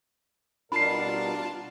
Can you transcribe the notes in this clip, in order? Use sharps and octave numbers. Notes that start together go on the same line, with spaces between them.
B2 G3 D4 F4 A#4 A5 B5 C7